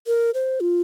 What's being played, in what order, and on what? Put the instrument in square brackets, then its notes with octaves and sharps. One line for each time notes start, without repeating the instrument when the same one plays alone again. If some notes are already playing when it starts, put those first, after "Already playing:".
[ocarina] A#4
C5
F4